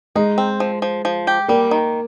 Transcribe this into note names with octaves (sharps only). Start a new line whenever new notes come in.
G#3 D#4
C4
F3
F3
F3
G4
G3 A#3
D#3